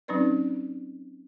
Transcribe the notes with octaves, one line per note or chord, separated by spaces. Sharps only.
F#3 C4 C#4 D#4 B4 D5